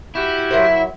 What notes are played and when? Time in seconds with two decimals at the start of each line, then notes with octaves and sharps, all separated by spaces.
0.15 E4 F#4 G4
0.51 F#3 A#4 C5 E5